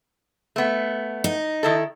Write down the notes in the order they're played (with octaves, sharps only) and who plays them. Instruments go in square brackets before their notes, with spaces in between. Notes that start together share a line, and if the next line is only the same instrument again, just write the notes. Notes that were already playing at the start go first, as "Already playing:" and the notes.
[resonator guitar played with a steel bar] A3 B3
[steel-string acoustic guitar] D#4
[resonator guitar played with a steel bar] D#3 E4 A4